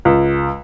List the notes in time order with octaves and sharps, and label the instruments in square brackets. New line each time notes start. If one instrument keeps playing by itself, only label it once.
[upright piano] C#2